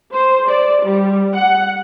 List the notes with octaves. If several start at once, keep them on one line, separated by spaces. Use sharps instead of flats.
C5
D5
G3
F#5